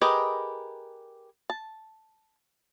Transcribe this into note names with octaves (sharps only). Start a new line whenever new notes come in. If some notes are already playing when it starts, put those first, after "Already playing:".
G4 G#4 A#4 B4 D#5
A5